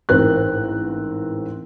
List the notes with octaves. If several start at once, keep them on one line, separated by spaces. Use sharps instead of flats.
A1 G#2 C4 A#4 F#6